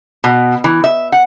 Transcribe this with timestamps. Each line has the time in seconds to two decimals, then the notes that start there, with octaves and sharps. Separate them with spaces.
0.24 B2
0.64 E3
0.84 E5
1.12 F#5